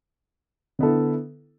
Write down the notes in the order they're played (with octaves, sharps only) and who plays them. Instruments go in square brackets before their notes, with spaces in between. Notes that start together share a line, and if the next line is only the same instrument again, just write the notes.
[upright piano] D3 B3 E4 A4